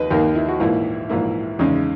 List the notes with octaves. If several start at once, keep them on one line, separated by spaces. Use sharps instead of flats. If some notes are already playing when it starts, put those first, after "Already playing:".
Already playing: D#2 D#3 A#3 B4 D#5
D#2 D#3 A#3 A#4
E4
F#4
A#1 G#2 E3 A#3 E4
A#1 G#2 E3 A#3 E4
E2 C#3 G#3 C#4 D#4